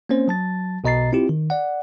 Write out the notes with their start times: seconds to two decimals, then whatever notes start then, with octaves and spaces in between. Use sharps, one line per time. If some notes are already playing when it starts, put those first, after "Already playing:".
0.09 A#3 C4 C#4 C5
0.28 F#3 A5 A6
0.84 B1 B2 D#5 A#5 A6 C7
1.12 C4 E4 F4 G4
1.29 D#3
1.50 D5 F#5